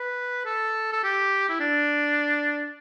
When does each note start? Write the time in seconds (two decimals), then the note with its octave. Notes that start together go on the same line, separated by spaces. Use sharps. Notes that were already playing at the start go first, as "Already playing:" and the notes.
Already playing: B4
0.45 A4
0.93 A4
1.04 G4
1.49 E4
1.60 D4